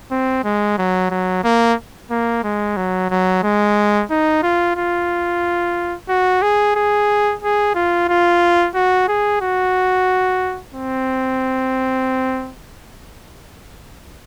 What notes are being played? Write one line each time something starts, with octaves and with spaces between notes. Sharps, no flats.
C4
G#3
F#3
F#3
A#3
A#3
G#3
F#3
F#3
G#3
D#4
F4
F4
F#4
G#4
G#4
G#4
F4
F4
F#4
G#4
F#4
C4